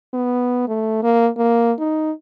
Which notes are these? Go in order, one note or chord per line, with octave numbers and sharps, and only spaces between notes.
B3
A3
A#3
A#3
D#4